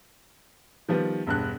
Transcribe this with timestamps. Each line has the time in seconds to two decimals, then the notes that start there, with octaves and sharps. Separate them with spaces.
0.89 D#3 F3 G3 B3
1.27 E1 G2 F#6